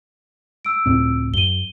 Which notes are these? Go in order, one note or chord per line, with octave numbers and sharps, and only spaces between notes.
E6 D7
C#2 A2 C4
F#2 D#7 G7